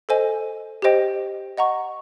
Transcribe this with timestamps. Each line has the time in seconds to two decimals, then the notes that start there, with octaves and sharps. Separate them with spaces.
0.09 A4 C5 D#5 G#5
0.82 G4 C5 D#5 G5
1.57 D#5 F#5 A#5 C#6